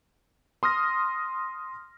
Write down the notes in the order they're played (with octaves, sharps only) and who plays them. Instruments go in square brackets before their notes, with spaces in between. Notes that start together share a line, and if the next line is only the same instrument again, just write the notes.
[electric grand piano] C6 D#6 F6 A#6